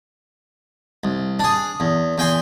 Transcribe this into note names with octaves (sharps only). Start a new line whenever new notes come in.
C2
D4 G#4
E2
E2 G5 G#5 C6